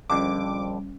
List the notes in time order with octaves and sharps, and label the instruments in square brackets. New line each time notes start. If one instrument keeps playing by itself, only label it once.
[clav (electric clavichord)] A#1 F2 D3 [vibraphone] G3 [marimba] C#4 [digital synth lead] D6